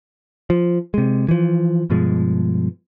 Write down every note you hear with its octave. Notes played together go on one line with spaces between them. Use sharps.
F3
C3 G#3
E3 F3
G2 B2 F3 G#3